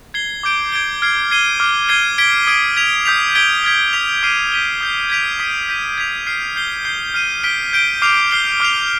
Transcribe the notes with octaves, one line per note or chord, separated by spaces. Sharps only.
G#6 C7 G7
D6 G6 D7 G7
G#6 D7 G7
F6 G#6 C7
G#6 C7 D#7 G7
D6 F6 C7
G#6 C7 D#7 G7
G#6 B6 D7 G7
D#6 G#6 D7 G7
G#6 B6 F7
D#6 G6 B6 F7
G#6 B6 D7 G7
F6 G#6 B6
D#6 B6 F7
D6 F6 C7 D#7
G6 B6 D#7 G7
D#6 G6 C7
G#6 B6 D7 F7
D#6 B6 D#7
G6 B6 D#7
G#6 B6 F7
F6 C7 D#7
G6 C7 G7
G6 C7 G7
F6 C7 D#7
F6 B6 D7 G7
G6 D7 G7
D6 F6 C7 F7
F6 C7 G7
D6 F6 C7 F7